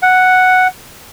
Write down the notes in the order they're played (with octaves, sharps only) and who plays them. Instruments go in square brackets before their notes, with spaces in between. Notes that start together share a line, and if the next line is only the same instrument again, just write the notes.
[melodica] F#5